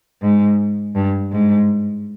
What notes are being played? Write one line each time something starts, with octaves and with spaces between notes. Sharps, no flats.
G#2
G2
G#2